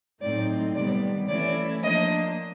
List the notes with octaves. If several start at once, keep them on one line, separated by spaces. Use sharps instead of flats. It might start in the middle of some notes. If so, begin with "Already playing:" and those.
A2 F#3 A3 C4 D#4 D5
C3 D#3 G3 B3 D5
E3 A3 C#4 E4 D5
F3 A#3 D4 D#5